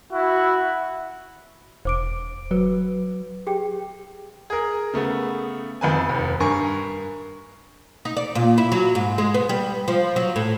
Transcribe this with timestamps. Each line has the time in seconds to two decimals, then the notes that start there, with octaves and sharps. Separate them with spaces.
0.12 E4 F#4
1.85 E1 C5 D6 D7
2.51 F#3 B4
3.47 G4 G#4 G5
4.50 G#4 A#4
4.94 C#3 A3 B3
5.81 F2 D#3 B4 G#5
6.09 F1 D#2
6.40 G2 A#4 G#5 C#6
8.05 D#4
8.17 D5
8.35 A#2
8.58 E4
8.72 F#3
8.95 G#2
9.18 G#3
9.34 B3
9.49 G3
9.88 F3
10.16 F#3
10.36 A2